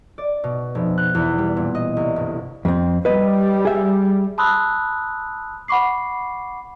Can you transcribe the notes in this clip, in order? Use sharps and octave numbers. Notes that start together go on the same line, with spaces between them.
D5
B2
F1
F#6
E2
G3
A#2
D#5
C2
G1
F2 C4
G3 B4 D#5
G#4 E5
A5 B5 C6 D#6 E6 F#6
F#5 B5 C#6 D6 C7